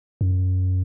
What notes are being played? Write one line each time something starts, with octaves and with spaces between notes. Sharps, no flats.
F#2